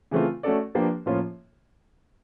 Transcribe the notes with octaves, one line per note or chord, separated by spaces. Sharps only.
C#3 E3 A3 C4 F4
A3 C#4 F#4 A4 D5
F3 A#3 D4 G4 B4
A2 F3 A#3 C#4 F4